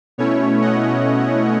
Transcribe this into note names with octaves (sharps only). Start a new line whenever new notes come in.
B2 A3 C#4 E4 C#5
D#5 F#5